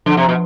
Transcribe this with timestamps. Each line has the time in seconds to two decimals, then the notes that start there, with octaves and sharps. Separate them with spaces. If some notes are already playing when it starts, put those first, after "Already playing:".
0.06 D3 F3
0.17 C3
0.29 B2